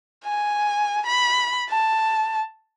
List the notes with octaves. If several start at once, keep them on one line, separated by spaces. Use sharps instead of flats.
G#5
B5
A5